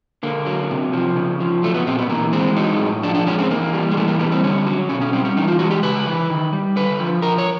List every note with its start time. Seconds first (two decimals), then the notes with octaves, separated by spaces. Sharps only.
0.23 D3 A#3
0.47 F#3
0.71 C3
0.93 F3
1.16 C#3
1.40 F3
1.63 F#3 A3
1.74 B3
1.86 A#2 C4
1.98 B3
2.09 E3 A#3
2.33 G#3 C4
2.56 F#3 D#4
2.80 A2
3.03 F3 D4
3.15 D4
3.26 G#3 C#4
3.39 C4
3.50 E3 A#3
3.73 G3
3.91 G#3
3.97 E3 A3
4.08 A#3
4.19 G3 B3
4.32 C4
4.44 D3 C#4
4.67 F#3
4.89 B2 C#4
5.01 C#4
5.13 G3 C4
5.25 C#4
5.37 E3 D#4
5.48 F4
5.59 G#3 F#4
5.71 G4
5.82 C#3 B4
6.07 E3
6.30 D#3
6.53 G3
6.76 D3 B4
7.00 F3
7.22 F3 A#4
7.38 C#5